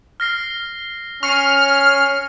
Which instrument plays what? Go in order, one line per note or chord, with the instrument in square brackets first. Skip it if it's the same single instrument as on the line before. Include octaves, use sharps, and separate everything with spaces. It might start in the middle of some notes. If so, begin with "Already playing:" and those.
[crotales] F6 A#6 C7
[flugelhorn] C#4 [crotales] C#6 C7 C#7 [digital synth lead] F6